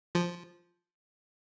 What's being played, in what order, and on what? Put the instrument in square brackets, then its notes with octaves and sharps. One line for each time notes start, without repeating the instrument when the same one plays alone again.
[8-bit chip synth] F3